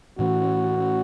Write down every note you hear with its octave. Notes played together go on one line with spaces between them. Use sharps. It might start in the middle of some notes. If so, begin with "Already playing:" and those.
A2 E3 A3 C#4 F#4